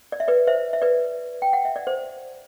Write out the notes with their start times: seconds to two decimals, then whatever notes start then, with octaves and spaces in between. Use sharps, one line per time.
0.12 D5
0.20 E5
0.28 B4 D5
0.47 C5 E5
0.73 E5
0.82 B4 D5
1.42 G5
1.53 F#5
1.65 E5
1.76 D5
1.87 C5